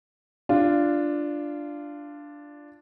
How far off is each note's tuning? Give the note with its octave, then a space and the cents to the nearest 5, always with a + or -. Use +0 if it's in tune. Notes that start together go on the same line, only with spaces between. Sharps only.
D4 +0 F4 -15